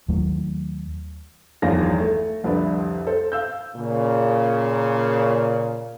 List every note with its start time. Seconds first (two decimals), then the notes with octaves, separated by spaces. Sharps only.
0.08 D#2 F#3 A3
1.62 G1 E2 D#3 F3 F5 A#6
1.99 A3
2.44 C2 F2 D3 B4 D5 E5
3.07 A4 C5
3.32 F5 E6 G6
3.76 A#2 C#3